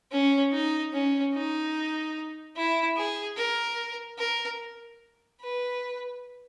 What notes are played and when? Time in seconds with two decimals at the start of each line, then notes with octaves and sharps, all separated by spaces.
0.11 C#4
0.52 D#4
0.93 C#4
1.34 D#4
2.56 E4
2.96 G#4
3.37 A#4
4.18 A#4
5.40 B4